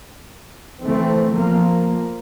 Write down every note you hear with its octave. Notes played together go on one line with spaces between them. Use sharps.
E3 A3 C4
F3 A#3